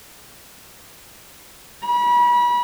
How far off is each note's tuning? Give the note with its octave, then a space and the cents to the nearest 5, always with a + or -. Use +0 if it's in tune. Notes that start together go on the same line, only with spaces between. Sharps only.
B5 -35